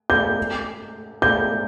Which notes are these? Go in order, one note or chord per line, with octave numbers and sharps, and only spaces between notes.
G6
G6